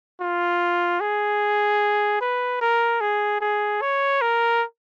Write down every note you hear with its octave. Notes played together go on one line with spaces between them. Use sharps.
F4
G#4
B4
A#4
G#4
G#4
C#5
A#4